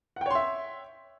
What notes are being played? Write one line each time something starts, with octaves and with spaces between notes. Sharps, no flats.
C#5 E5 F#5 G5 C6